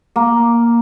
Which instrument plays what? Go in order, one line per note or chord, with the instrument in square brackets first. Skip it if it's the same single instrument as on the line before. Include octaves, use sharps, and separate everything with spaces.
[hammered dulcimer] A#3